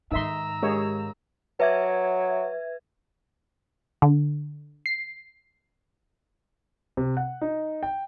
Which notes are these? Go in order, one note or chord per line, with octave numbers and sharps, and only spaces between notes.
G#2 D#3 D#4 E5 A#5 C6 E6
G#3 G4 G#4 A#4 C#5 D#5
F#3 B4 E5 G#6
D3
C7
C3
F#5
D#4
G5